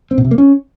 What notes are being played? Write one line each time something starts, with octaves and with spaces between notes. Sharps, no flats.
C4
B2
C3
A#3
C#4